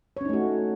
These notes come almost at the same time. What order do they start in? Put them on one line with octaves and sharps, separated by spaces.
C#5 C#4 D#4 A3 F#4